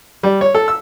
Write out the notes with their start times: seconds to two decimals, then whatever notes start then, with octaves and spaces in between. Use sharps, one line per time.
0.23 G3
0.41 C#5
0.55 A4
0.68 E6